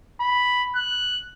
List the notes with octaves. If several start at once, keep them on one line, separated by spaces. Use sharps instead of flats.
B5
F#6